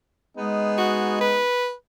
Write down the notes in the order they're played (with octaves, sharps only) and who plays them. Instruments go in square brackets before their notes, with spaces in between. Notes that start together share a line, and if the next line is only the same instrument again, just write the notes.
[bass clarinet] G#3 [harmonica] B3 D#4 G#4
[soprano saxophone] F#4
B4